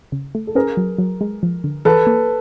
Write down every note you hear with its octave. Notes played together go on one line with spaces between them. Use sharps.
C#3
A3
A4
C#4 G#4 A#4
F#3
F#3
G#3
F3
D3
E3 A4 B4
A#3